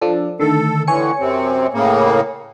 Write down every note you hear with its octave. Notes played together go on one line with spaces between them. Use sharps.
F3 D4 A4
D3 D#3 A3 A4
A2 D3 E3 C#5 G#5 C#7
F#2 C3 C4
A2 C#3 A#3